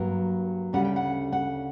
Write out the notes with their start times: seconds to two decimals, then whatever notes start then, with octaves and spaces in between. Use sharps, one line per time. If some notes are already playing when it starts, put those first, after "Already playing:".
Already playing: G2 F#3 A#3 A#4
0.73 D2 C#3 G3 C#4 F#5
0.85 G5
0.96 F#5
1.32 F#5